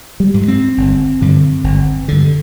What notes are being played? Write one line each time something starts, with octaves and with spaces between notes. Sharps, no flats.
G3
G#2
C4
G1
G2 D3
G1
G2 D3